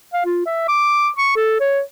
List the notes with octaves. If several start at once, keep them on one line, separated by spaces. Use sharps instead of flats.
F5
F4
E5
D6
C#6
A4
C#5